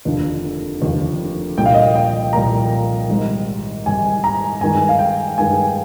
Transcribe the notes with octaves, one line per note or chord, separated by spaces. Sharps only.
F1 D#2 D3 F3
F1 D#2 D3 F3
C2 A#2 F3 A#3 G5
F5
D#5
F5
G5
C2 A#2 F3 A#3 A#5
G#1 G#2 G3
G#1 G#2 G3 G#5
A#5
G2 D#3 G#3 G#5
F5
G5
G2 D#3 G#3 G#5